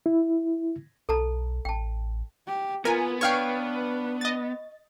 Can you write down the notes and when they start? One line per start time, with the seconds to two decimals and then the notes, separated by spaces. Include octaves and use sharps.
0.06 E4
1.09 B1 A4 A5 A#5
1.65 A1 G5 A5
2.47 G4
2.85 B3 F4 A#4 G#5
3.21 D4 B4 C#5 F5 G5 C#6 F6 C7
4.21 D#5 A6